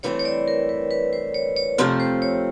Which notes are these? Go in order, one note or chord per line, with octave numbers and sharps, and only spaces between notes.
G2 E3 A3 C4 E4 C#5
C#5
D5
A#4
B4
B4
C5
C#5
C#5
F2 C3 F3 A3 C4
C5
C#5